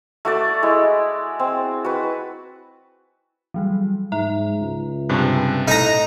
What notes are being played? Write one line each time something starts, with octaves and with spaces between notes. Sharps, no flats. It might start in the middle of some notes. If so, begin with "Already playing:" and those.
A3 F#4 D5
G#3 E4
C4
F#4 B4
E3 F#3 G3
G#2 E5 A#5
C#2
G2 C3 G#5 A5 F#6
A2 D#4 A4 A#5 F#6